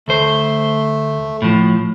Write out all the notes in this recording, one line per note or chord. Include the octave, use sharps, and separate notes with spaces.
D2 A3 C5
A2 F3